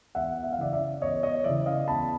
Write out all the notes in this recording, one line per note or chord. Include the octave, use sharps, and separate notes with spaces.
E2 E5 F#5
E5
F5
C#3 E3 D5 E5
D5 E5
E2 C#5 D#5
C#5 D#5
C#3 E3 D5 E5
D#5 F5
E2 A5 B5